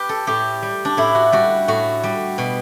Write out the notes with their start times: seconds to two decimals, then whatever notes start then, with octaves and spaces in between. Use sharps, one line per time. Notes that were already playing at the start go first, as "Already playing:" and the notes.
Already playing: G4 B4
0.09 A4
0.27 A2 G4
0.62 G3
0.85 D4
0.97 A2 E4
1.15 F#4
1.32 G3 F#4
1.68 A2 F#4
2.04 G3
2.38 B2